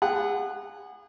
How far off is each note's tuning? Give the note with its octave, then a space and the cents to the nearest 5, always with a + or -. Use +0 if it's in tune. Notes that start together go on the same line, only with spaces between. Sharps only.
G#4 -35 F#5 +0